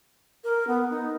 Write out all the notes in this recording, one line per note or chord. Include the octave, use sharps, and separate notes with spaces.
A#4
B3
D#4